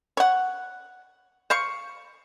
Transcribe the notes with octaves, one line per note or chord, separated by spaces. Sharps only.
C#5 F#5
C5 F5 C#6